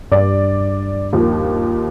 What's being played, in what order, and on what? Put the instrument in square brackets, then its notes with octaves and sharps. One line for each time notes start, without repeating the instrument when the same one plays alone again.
[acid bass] G2 [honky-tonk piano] D5
[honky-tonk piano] D#2 F3